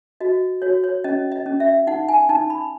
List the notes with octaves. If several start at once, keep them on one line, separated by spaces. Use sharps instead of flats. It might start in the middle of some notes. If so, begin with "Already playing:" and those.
F#4 D#5
F#4 C#5
C#5
C#4 D#5
D#5
C#4
E5
D#4 F#5
G#5
D#4 A5
B5